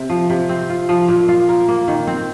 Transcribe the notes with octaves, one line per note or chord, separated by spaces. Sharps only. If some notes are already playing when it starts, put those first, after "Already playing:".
Already playing: C3 C4
F3
C3
C4
F4
F3
A#2
F4
A#4
A#3
D#3
C4